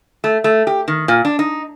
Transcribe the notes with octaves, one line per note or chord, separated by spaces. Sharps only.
A3
A3
G4
D#3
A#2
D4
D#4